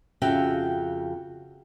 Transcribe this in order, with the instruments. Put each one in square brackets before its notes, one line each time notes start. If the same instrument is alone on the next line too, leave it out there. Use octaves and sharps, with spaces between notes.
[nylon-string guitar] F2 C#3 F#4 E5 G5